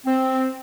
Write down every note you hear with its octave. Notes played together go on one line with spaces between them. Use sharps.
C4